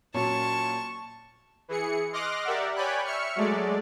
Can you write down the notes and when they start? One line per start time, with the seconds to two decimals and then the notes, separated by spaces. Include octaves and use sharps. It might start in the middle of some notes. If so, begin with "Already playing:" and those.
0.14 A#2 F#3 C#4 A5 C#6
1.68 E3 G#4 C#7
2.13 D#5 C6 D6 F6 F#6 A#6
2.45 G4 A#4 D5 E5 F#5
2.75 C#5 D5 G5 G#5 B5 F#6
3.04 E5 C#6 F6 C#7
3.36 F#3 G#3 A3 D5